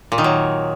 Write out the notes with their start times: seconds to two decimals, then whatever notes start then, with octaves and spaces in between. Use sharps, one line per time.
0.12 A#2
0.18 D#3
0.24 F#3